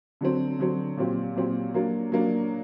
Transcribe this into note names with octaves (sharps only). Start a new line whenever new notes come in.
D3 F#3 C4
D3 F#3 C4
A#2 F#3 C4 G4
A#2 F#3 C4 G4
F#3 A#3 D4
F#3 A#3 D4